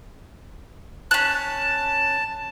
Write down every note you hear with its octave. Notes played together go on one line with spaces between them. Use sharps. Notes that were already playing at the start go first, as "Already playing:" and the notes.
C#4 A5 F#6